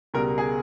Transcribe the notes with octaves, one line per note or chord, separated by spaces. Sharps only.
C#2 B2 G3 A#4
G#4